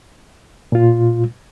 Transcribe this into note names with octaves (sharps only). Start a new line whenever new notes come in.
A#2 F4